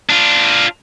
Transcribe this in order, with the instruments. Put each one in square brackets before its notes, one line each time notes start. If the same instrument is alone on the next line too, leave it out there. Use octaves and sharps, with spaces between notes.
[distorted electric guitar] D4 F4